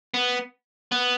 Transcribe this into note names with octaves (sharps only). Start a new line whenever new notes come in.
B3
B3